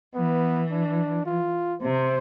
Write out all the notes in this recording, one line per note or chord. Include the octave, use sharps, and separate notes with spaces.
E3 B3
D4
F4
C3 C5